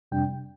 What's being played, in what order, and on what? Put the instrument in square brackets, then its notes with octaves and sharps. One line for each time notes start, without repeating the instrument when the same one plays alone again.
[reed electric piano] F2 C3 G3 D4 G5